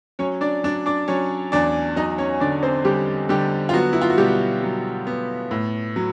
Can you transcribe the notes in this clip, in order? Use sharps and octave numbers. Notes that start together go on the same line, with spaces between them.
F#3 C#4 C#5
D4 D5
F#3 D4 D5
D4 D5
F#3 C#4 C#5
E2 D4 D5
F#3 D#4 D#5
C#4 C#5
D3 D4 D5
C4 C5
D3 G3 G4
D3 G3 G4
F4
F#3 B3 F#4
E4
F4
F#4
B2 G3 G4
F#3
B3
A2
F#3